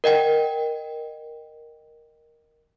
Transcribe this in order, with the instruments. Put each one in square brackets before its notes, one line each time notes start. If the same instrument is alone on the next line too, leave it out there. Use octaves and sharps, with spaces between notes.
[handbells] A#4 D#5 F#5 G5